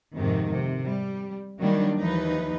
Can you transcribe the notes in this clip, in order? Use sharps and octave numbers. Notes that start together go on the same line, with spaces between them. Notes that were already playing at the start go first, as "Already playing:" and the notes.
F2 G#2 C3 D#3
C3
G3
D#3 F#3 G3 A#3 D4
D#2 E3 F3 D#4 B4